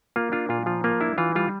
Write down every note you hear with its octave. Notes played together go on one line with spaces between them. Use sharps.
A#3 F4
D4 F4
A#2 F4
F3 F4
A#3 F4
D4 E4
E3 F4
G3 F4